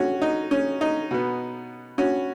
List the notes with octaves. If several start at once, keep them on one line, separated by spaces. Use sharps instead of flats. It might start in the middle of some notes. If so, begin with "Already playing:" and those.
Already playing: C#4 F#4
D#4
C#4
D#4
B2 B3
C#4 F#4